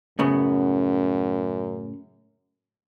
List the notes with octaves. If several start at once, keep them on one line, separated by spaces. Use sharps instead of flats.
F#2 A2 C#3 B3